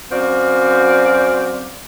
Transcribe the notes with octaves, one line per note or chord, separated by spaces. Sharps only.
F#2 C4 F#4 D5 F5